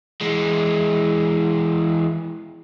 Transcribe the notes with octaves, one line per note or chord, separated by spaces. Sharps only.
E3 G#3